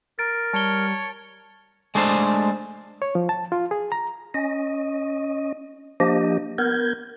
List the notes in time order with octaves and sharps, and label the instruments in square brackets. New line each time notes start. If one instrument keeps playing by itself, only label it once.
[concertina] A#4 [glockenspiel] A6 D7
[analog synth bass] G3 [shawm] C#5 [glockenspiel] A5 G7
[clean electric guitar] G#3 A3 D4 A4 C5
[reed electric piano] C#5
F3
A5
F4
G#4
A#5
[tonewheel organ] C#4 D#5
F3 A#3 D4 G4 D#5
B3 A#4 G6 G#6